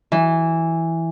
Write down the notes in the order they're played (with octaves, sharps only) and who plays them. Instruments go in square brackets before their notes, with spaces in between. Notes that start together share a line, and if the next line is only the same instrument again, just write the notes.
[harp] E3